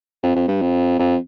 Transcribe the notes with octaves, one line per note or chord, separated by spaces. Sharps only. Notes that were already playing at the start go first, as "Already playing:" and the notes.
F2
F2
G2
F2
F2